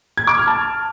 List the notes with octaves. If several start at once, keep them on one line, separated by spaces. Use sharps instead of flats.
G#6
D6
F6
A5